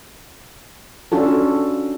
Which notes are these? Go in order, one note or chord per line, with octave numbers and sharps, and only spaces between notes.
C#4 D4 F4 F#4 A4